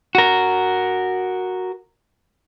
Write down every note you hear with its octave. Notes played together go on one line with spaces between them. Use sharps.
F#4 A#4